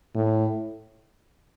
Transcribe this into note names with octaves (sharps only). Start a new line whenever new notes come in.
A2